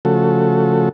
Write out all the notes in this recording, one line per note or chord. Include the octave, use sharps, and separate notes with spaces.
C#3 F3 A3 F#4 A4